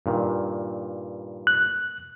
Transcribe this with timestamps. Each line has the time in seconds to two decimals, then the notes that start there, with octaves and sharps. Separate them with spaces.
0.06 G2 A#2 D#3
1.47 F#6